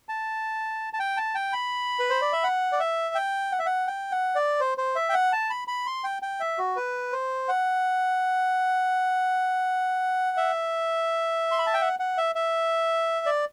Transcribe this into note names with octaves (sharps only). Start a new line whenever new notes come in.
A5
A5
G5
A5
G5
B5
B4
C5
D5
E5
F#5
D5
E5
G5
F#5
E5
F#5
G5
F#5
D5
C5
C5
E5
G5
F#5
A5
B5
B5
C6
G5
G5
E5
F#4
B4
C5
F#5
E5
C6
B5
A5
G5
F#5
F#5
E5
E5
D5